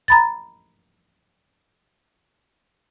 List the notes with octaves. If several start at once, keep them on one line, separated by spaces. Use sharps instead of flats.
A#5 B5 A6